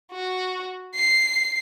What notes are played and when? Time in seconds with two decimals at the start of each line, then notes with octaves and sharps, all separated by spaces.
0.12 F#4
0.95 C7